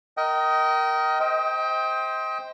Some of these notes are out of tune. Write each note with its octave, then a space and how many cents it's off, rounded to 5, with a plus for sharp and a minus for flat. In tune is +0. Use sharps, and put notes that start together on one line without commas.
A#4 +0 D#5 +15 G5 -25
C5 +0 D#5 +35 G5 +10